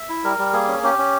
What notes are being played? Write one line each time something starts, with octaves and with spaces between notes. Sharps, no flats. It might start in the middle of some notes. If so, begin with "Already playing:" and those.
Already playing: E5
E4
G3 A#4
G3
A#3 G#4
C#4
C#4 G4
C#4